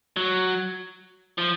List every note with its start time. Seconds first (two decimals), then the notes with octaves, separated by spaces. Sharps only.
0.16 F#3
1.38 F3